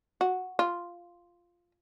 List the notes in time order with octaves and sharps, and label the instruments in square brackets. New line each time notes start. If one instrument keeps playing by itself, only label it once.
[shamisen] F#4
F4